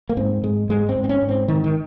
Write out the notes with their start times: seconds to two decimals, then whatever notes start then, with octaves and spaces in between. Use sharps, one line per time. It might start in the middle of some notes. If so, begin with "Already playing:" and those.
0.09 A#3
0.17 G#2 C4
0.43 G#2 G#3
0.69 G#2 G#3
0.89 C4
0.96 G#2
1.04 C4
1.09 C#4
1.22 G#2
1.29 C4
1.48 G#2 D#3
1.64 D#3